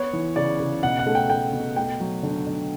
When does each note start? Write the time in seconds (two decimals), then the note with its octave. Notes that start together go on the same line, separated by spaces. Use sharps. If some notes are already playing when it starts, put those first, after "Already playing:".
Already playing: B3 C#5
0.13 E3
0.36 C#3 D5
0.60 C#3
0.83 B2 F#5
0.99 F#5
1.07 A3
1.15 G5
1.30 A3 G5
1.53 B2
1.76 A3 G5
2.00 F#3
2.23 D3
2.47 D3